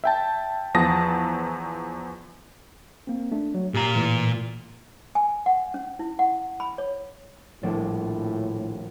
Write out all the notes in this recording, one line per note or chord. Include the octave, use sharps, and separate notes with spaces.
E5 G5 A5
E2 F3 A5 D#6 A#6
A#3 C4
A3 D4
F#3
A#2 G4 A#5
A2 E3 A3
G#5
F#5
C#4
E4
F#5
B5
C#5
D#1 A#1 A2 D4